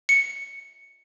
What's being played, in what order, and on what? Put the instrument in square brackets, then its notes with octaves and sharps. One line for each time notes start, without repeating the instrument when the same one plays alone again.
[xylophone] C#7